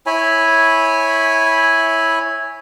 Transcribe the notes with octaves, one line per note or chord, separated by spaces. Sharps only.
E4 C#5 G#5 B5